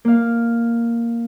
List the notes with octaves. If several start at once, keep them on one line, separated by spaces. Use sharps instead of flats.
A#3 F5